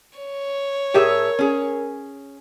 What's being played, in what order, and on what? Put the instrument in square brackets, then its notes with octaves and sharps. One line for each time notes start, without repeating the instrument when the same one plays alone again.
[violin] C#5
[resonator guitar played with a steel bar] A2 G#4 E5 [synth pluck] G4 [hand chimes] A#4 G#6
[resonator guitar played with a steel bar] C#4 G#4